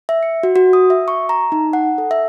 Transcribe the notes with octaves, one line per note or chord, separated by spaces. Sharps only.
E5
C#7
F#4
F#4
D#6
E5
C#6
A#5
D#4
F#5
A4
E5